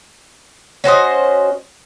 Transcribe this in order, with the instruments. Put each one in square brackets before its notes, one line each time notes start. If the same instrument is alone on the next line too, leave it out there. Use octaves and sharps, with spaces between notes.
[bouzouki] C#4 F#4 C5 D#5